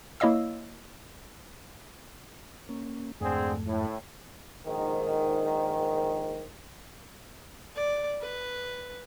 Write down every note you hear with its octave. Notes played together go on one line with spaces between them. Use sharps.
A#3 E4 C#5 D#5 F5 E6
A#3 C#4
F2 G#2 D3 A3 C4 G#4
A2
A#1 G#2 D#3
D5
B4